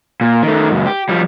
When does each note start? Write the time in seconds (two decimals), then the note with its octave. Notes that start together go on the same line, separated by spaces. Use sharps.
0.21 A#2
0.43 D#3 A3
0.71 C#2 F#2
0.86 G4
1.09 F3 G3